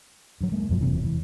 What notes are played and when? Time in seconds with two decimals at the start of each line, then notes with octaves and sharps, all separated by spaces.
0.41 G2 F#3
0.52 G#3 A#3
0.69 E1 F#2 F3
0.81 E1 C3 E3
1.05 E3